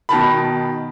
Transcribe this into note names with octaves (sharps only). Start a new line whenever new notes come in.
B2 D#3 A5 B5